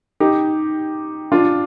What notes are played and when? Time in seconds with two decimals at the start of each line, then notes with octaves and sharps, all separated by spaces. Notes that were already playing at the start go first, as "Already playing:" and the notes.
0.20 D#4 G4
1.32 D4 F4